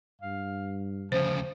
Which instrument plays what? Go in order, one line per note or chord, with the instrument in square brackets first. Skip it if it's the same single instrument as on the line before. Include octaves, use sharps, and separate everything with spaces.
[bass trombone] G2 [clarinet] F5
[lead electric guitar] D2 C#3 [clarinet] F3 [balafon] C5